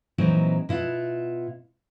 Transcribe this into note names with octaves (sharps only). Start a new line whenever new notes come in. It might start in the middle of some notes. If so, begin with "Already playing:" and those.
A#2 E3 F#3 C4 D#4 E4
B2 E4 F4 F#5